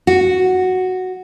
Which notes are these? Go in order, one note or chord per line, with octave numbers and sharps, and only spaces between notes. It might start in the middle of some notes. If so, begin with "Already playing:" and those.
F#4